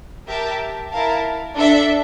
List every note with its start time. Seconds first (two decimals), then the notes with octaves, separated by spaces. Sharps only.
0.27 G4 A#4 E5 A5
0.91 E4 A#4 F5 A5
1.56 D4 A4 E5